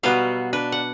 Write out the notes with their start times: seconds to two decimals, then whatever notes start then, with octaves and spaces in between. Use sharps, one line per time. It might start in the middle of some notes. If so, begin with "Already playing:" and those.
0.03 B2 F#3 G3 B3 F#4 F5
0.53 D4 B4
0.72 F#5